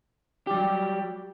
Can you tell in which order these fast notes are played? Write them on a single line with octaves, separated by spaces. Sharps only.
G4 G3 F#3